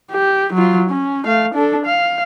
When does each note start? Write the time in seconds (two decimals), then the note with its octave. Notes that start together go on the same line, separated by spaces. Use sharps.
0.11 G4
0.54 F#3 F4
0.89 C#4
1.25 A3 F5
1.54 D4 A4
1.86 F5